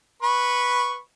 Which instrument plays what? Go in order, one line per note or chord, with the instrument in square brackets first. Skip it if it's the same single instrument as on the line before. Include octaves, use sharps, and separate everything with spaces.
[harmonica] B4 B5 C#6